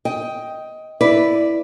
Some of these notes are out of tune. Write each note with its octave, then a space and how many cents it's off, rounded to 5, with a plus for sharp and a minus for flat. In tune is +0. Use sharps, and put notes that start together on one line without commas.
D#5 +15 G5 +0
E4 +0 B4 +0 D5 +0